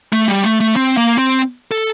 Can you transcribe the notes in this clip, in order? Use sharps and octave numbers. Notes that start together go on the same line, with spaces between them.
A3
G3
A3
A3
C4
A#3
C4
A4